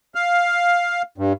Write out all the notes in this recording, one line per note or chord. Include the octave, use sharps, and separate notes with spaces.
F5
G2